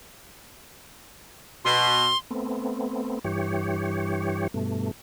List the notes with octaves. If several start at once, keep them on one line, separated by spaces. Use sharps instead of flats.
B2 C6
A3 B3 C4
G2 E3 G4 C#5
G2 B2 A3